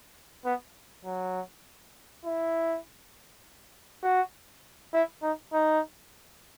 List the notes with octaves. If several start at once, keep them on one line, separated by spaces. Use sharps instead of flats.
B3
F#3
E4
F#4
E4
D#4
D#4